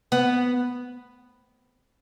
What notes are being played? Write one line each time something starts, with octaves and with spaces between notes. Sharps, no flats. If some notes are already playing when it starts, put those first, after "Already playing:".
B3